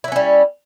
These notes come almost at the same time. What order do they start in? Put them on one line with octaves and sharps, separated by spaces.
E4 F#3 C#4 G3